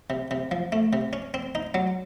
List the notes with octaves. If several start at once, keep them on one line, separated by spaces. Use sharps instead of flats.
C3
C3
F3
A3
C3
C#4
C4
D#4
F#3